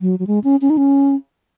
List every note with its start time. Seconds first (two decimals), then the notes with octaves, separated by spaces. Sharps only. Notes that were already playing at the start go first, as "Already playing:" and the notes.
0.01 F#3
0.19 F#3
0.27 G#3
0.44 C#4
0.61 C#4
0.70 D#4
0.77 C#4